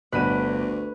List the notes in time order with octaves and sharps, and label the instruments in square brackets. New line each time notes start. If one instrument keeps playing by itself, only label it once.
[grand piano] G1 B6 D#7 [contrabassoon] D2 [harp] B4